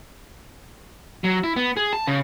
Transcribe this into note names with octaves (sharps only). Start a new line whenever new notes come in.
F#3
E4
B3
G#4
A5
C#3